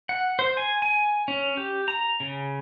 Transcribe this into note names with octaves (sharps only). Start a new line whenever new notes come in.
F#5
C5
G#5
G#5
C#4
G4
A#5
C#3